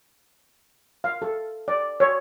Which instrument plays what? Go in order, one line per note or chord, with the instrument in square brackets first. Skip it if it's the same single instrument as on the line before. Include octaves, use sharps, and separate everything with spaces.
[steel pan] F5
A4
D5
C#5